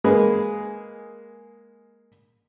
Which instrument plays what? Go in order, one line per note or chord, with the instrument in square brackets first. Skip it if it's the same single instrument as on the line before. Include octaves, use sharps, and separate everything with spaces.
[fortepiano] G#3 A#3 G#4 B4